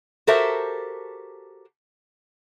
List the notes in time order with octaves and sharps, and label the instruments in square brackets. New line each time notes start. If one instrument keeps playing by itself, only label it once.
[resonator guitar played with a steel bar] F#4 G4 A4 A#4 C5 E5